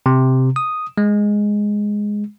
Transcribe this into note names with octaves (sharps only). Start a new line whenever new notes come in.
C3
D#6
G#3